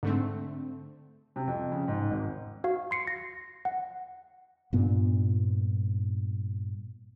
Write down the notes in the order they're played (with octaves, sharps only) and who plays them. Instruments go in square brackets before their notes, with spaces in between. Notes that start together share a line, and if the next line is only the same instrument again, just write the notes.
[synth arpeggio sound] G#2 [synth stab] D3 A3 C4
[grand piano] C3
F2
C#3
G#2
G#1
[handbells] F#4 F5
C6 C7 C#7
A#6
F#5
[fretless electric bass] G2 A#2 B3